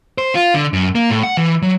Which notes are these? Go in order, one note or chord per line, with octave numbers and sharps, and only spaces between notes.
C5
F4
D3
F#2
A#3
A2
F#5
E3
F#3